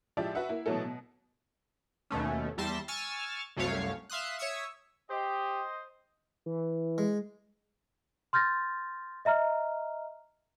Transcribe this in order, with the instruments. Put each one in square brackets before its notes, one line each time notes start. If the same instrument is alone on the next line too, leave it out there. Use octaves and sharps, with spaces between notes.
[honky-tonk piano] F3 G#3 E4 G4 D5 E5
F#4 B4 E5 F#5
A#3 E4
B2 E3 F#3 A3 A4
B2
[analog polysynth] D#2 B2 A3 C#4
E2 G3 E5 A5 C6 A#6
G#5 C#6 E6 F6 A6
C2 F#2 C3 A3 C#5 F5
E5 F5 C6 D#6 F#6
C#5 E5 C#6 D#6 E6 C#7
[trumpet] G4 [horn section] C5 D#5
[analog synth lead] E3
[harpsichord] G#3
[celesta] C6 F6 G6 A6 A#6
D#5 E5 A#5 F6